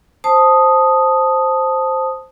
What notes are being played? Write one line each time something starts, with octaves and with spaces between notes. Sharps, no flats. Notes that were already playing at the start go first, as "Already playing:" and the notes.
C5 A5 D#6